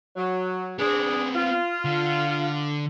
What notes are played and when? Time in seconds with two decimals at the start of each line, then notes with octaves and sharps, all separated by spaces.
0.17 F#3
0.79 B3 C4 D4 G#4
1.35 F4
1.85 D3